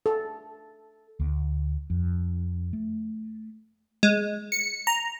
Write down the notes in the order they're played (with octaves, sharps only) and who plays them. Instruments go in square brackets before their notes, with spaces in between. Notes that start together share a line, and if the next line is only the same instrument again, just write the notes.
[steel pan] A4
[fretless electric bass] D2
F2
A3
[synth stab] G#3
C#7
A#5